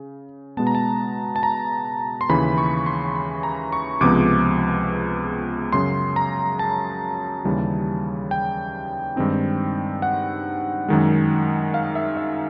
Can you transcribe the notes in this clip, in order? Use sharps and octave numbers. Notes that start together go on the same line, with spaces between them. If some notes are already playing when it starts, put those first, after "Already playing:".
Already playing: C#3
B2 G#3 B3 A5
A#5
A5
A5
A#5
C6
D#2 C#3 E3 B5
C#6
C6
B5
A#5
C#6
C#2 C3 F3 G#3 B3 D6
F#2 C#3 F#3 C6
A#5
A5
D#2 C#3 E3 G3
G5
G2 D#3 G#3 C4 D#4
F#5
F#2 D#3 G#3
F5
E5
E5